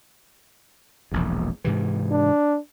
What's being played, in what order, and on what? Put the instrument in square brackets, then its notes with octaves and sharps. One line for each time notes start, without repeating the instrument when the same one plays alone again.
[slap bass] E1 A#1 E2
G#2 C3 E3
[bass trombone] D4